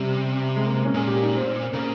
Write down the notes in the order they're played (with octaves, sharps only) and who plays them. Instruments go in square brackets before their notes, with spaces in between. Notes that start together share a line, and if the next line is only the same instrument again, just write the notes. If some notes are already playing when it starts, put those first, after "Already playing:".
Already playing: [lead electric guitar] C3 [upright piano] G3
[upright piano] G#3
A#3
C#4
[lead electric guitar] A#2 [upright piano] G#4
[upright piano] G4
D#4
C4
[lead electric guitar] C#3 [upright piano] A#3